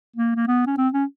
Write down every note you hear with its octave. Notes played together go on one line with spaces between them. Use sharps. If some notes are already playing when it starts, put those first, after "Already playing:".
A#3
A#3
B3
C#4
C4
C#4